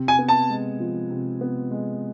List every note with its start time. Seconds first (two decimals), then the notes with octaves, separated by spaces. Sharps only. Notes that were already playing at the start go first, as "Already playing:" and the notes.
Already playing: C3
0.08 G#5
0.19 B3
0.28 A5
0.50 G#3
0.80 F3
1.10 C3
1.41 B3
1.71 G#3